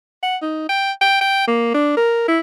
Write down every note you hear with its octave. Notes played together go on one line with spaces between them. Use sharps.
F#5
D#4
G5
G5
G5
A#3
D4
A#4
E4